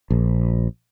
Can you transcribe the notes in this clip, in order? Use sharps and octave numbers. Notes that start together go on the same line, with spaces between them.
A#1